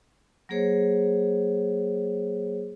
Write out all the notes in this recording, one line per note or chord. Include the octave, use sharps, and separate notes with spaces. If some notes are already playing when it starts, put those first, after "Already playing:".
F#3 A#3 G#4 C5 C#5